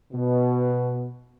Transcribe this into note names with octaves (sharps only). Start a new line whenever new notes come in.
B2